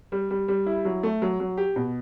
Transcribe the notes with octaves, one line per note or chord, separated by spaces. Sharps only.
G3
G3
G3
E4
F#3
A3
F#3
F#3
G4
B2